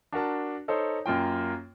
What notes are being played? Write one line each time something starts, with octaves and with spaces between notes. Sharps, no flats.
D4 F#4 A#4 A5
D#4 A4 C5 C#5
F#2 A#3 F4 G5